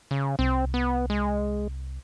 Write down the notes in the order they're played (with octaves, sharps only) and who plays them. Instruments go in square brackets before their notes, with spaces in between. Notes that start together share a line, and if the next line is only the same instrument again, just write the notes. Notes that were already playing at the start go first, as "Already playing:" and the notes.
[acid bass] C#3
[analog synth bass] C2 [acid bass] C4
[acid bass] B3
G#3